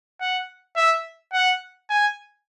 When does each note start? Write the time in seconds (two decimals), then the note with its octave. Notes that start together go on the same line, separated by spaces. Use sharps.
0.21 F#5
0.77 E5
1.33 F#5
1.90 G#5